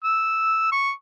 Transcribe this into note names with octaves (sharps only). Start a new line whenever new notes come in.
E6
C#6